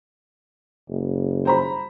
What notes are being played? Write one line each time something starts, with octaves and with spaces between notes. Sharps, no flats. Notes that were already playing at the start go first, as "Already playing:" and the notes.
F#1
C5 A#5 B5